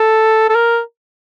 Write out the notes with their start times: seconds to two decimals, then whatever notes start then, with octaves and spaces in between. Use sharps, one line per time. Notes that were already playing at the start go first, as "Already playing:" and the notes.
Already playing: A4
0.50 A4
0.55 A#4